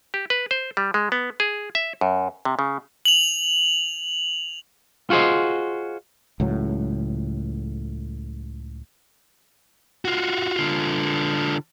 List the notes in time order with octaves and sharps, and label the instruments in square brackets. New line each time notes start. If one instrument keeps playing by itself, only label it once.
[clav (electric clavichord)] G4
B4
C5
G3
G#3
B3
G#4
E5
F#2
C3
C#3
[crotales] F7 F#7
[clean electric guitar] F4 F#4 G#4 C5 D#5
[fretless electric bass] C#2 A2 F#3
[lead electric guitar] F4 F#4
D3 F4